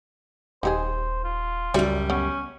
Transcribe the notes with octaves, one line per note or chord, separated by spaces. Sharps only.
D#1 D#4 G4 G#4 C5
F4
C#2 F#2 G3 F#4 D5 E5
B3 C#4